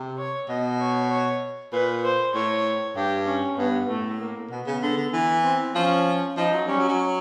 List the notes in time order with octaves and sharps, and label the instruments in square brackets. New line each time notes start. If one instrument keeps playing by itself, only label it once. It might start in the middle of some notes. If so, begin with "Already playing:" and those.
Already playing: [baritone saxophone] C3
[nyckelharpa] C#5
[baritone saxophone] B2 [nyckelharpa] D#5
[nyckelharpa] C#5
C#5
[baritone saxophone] A#2 [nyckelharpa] B4
[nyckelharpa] C5
[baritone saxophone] A2 [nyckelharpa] C#5
[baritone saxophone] G2 [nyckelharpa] G4
[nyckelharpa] C#4
[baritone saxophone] G2 [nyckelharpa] B3
[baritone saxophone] A2 [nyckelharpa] A3
[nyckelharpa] A#3
[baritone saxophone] B2 [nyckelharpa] B3
[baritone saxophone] C#3
D3
D3
E3
[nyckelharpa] C4
[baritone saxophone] F3 [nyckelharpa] C#4
[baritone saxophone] F3 [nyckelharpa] D#4
[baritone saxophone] F#3
[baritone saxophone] G3 [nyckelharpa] C#4
[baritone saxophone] F#3
F#3